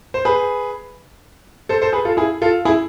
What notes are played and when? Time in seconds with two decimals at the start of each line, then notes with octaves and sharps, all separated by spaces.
0.14 C5
0.25 G#4 B4
1.69 A4 C5
1.82 A4 C5
1.93 G#4 B4
2.05 F4 A4
2.17 E4 G#4
2.42 F4 A4
2.65 E4 G#4